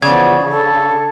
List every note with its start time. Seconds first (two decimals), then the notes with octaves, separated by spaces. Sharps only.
0.02 C#3 E3 F3 B3 D5 G#6
0.50 D4 A4